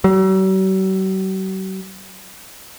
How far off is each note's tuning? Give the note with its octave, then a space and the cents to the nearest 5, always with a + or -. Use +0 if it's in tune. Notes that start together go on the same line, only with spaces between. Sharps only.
F#3 +45